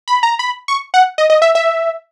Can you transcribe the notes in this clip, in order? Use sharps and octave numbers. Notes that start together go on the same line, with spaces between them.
B5
A#5
B5
C#6
F#5
D#5
D#5
E5
E5